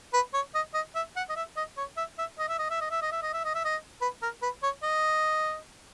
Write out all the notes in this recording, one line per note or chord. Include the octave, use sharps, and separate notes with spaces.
B4
C#5
D#5
D#5
E5
F#5
D#5
E5
D#5
C#5
E5
E5
D#5
E5
D#5
E5
D#5
E5
D#5
E5
D#5
E5
D#5
E5
D#5
B4
A#4
B4
C#5
D#5